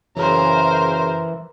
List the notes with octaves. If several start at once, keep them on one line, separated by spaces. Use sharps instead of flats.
F#2 C#3 E3 A#4 C5